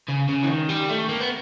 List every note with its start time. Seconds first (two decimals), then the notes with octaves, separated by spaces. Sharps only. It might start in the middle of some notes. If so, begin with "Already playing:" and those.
0.09 C#3
0.29 C#3
0.43 E3
0.49 D#3
0.69 G3
0.89 A3
1.09 A#3
1.20 B3